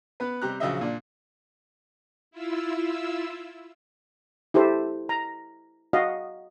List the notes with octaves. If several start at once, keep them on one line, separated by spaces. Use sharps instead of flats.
B3 B4
C3 G3 C4 G4 A#5 F#6
A#1 C#3 F#3 D#5 E5
A#2 D4
E4 F4 E6
E4 G4 A4 C5 E5
A#5
F#4 D#5 F5